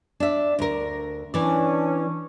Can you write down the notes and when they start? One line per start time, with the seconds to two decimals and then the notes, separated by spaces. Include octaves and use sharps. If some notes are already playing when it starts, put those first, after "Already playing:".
0.20 D4 E5
0.59 D2 A#4
1.34 E3 C#4 D4 D5